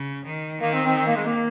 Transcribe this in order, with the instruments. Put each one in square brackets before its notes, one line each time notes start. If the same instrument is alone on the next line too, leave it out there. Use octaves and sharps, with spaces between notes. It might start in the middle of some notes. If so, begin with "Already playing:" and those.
Already playing: [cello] C#3
D#3
[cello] D#3 [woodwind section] A#3
[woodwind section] C4
C4
C4
A#3
G#3
A#3